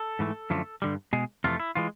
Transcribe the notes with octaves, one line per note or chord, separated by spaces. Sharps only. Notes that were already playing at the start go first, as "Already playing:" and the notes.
Already playing: A4
G#2 E3 A3
F#2 D3 F3 A3
G2 D3 G3
B2 G#3 G#4
F2 C3 E3 A3 F4
E4
E3 G#3 F4